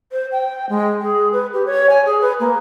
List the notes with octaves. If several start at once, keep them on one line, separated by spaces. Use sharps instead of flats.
C5
G5
G#3
G#4
B4
G4
C#5
G#5
G#4
B4
A#3